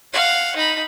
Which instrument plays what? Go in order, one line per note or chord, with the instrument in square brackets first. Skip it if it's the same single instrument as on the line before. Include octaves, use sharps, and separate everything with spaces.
[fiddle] F5 F#5
D#4 B5